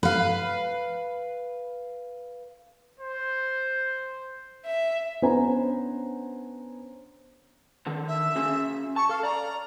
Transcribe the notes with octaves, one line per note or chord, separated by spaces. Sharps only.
B4 F5
C5
E5
B3 C#4 D4 C5 G#5 A#5
D3 D#3 A4
E5
C#4 F#4 G#4
A5 C#6
A4 F5
D5 A#5